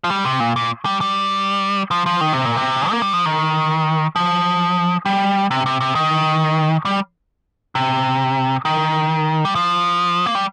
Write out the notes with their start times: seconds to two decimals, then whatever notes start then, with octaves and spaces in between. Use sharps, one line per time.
0.04 F3
0.10 G3
0.25 C3
0.40 A#2
0.56 A#2
0.85 G3
1.01 G3
1.91 F3
2.06 F3
2.21 D#3
2.33 C3
2.45 A#2
2.57 C3
2.91 A#3
3.02 G3
3.13 F3
3.26 D#3
4.16 F3
5.06 G3
5.51 C3
5.66 C3
5.81 C3
5.95 D#3
6.85 G3
7.75 C3
8.65 D#3
9.45 G3
9.55 F3
10.26 A#3
10.35 G3